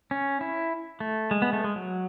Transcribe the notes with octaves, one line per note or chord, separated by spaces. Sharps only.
C#4
E4
A3
G#3
B3
A3
G#3
F#3